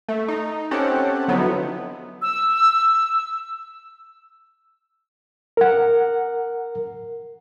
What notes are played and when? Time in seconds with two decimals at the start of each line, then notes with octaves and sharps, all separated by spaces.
0.09 A3
0.28 D#4
0.71 C4 C#4 G4 A4 F#5
1.28 D3 F3 F#3 B3 D#4 E4
2.22 E6
5.57 A#4 F#5